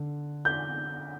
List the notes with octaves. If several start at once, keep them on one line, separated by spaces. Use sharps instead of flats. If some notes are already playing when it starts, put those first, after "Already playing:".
Already playing: D3
G6